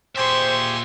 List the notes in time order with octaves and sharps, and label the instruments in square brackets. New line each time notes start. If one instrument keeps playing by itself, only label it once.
[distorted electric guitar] A#2 E5 [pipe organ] G4 G#4 [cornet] C5 [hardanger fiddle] C6 C#6